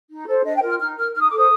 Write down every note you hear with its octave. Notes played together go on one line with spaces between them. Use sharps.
D#4
A4 C5
D4 D#5
G5
F4 A#4
F6
D#4 F6
A#4 F6
D#4 F6
D#6
D6
A4 C5 D#6